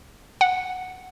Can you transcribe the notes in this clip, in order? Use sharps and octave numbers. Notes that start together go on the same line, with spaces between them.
F#5